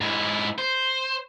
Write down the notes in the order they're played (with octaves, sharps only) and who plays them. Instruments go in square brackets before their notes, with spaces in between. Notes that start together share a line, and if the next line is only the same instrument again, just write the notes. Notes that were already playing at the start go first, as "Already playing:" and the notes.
[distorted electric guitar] G#2 E4
C5